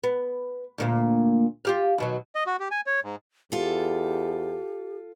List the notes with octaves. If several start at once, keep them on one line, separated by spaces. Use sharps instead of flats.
B3
D2 A#2 A#3
F4 G4 F5
D#2 B2 F#3
D#5
F#4
G4
G#5
C#5
G#2
E2 F4 G4 A4